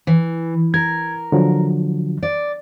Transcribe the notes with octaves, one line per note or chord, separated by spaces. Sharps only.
E3
A#4 G#6
D3 F3 F#3
D5